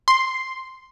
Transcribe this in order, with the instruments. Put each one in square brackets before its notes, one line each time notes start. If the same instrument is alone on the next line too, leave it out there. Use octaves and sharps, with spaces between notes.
[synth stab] C6